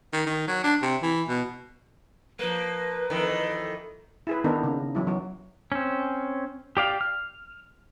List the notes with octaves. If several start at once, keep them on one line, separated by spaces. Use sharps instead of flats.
D#3
D#3
F#3
D4
C3
E3
B2
F3 A#3 B4
F2 D#3 E3
E4 G#4 B4
D#3 B3 D4 D#4 A4 A#4
C#3 A#3
E3 F#3 E4
F#3 F#4
C4 C#4
G4 D5 F5
F6